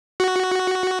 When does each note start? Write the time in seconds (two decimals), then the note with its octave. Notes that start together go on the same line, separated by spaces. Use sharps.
0.20 F#4